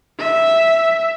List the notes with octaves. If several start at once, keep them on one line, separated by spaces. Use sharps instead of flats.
E5